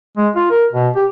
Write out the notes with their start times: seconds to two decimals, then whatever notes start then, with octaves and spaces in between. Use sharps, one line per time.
0.17 G#3
0.35 F4
0.50 A#4
0.73 B2
0.96 G4